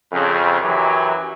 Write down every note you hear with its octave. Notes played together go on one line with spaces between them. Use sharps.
F2 C#3
F#2 E3 F#3 G4